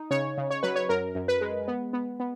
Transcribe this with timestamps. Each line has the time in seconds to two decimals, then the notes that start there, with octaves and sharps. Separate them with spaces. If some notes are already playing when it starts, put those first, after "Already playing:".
Already playing: D#4
0.11 C#3 C#5
0.38 C#3
0.51 C#5
0.63 F#3 B4
0.76 C#5
0.89 F#2 A#4
1.15 F#2
1.28 B4
1.41 G#3
1.68 B3
1.93 B3
2.20 B3